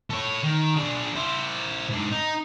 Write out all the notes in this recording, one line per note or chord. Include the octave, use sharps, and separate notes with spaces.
A4 C#5
D#3
D4 G#4
E4 C5
G#2 D4
D#4